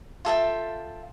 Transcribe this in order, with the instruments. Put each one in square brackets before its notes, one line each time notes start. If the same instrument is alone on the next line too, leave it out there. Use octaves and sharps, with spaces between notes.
[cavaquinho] F4 A4 E5 G5